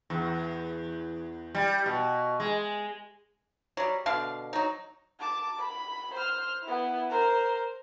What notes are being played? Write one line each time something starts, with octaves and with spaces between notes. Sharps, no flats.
E2
G3
B2
G#3
F#3 G3
B2 D3 F5
F#3 D#4
A5 D6
B5
C5 F6
B3 E4
A#4 C5